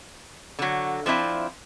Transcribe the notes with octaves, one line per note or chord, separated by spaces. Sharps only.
D3 F#3
F3 C4 D4 E4 F4